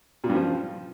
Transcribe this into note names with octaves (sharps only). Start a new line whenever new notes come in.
A#2
G2
F3